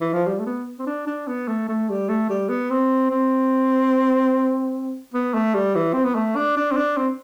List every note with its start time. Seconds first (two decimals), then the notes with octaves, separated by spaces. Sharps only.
0.01 E3
0.13 F3
0.26 G3
0.39 A3
0.46 B3
0.79 C4
0.86 D4
1.07 D4
1.27 B3
1.48 A3
1.69 A3
1.89 G3
2.09 A3
2.30 G3
2.49 B3
2.70 C4
3.10 C4
5.14 B3
5.34 A3
5.54 G3
5.75 E3
5.93 C4
6.04 B3
6.15 A3
6.36 D4
6.57 D4
6.71 C4
6.76 D4
6.97 C4